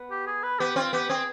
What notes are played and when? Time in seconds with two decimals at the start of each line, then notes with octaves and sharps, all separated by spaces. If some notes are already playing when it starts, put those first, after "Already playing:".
Already playing: B3
0.11 G4
0.27 G#4
0.43 B4
0.59 B3 G4
0.76 C4 F4
0.93 B3 G4
1.10 C4 G#4